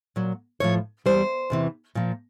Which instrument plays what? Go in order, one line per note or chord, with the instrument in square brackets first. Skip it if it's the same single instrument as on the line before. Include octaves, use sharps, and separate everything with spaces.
[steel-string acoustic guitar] A#2 F#3
A2 F3 C#5
E2 B2 G3 C5
E2 C3 E3
A#2 F3